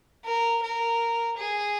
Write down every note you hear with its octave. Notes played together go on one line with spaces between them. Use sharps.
A#4
A#4
G#4